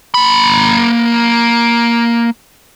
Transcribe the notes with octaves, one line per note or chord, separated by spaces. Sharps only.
A#3 B5